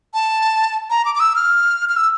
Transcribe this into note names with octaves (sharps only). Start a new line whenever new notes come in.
A5
A#5
D6
D6
E6
F6
F6
E6